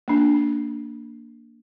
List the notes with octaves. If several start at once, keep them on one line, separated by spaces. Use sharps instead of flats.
A#3 D4